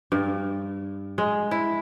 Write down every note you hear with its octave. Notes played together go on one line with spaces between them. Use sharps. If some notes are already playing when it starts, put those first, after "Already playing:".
G2
G#3
E4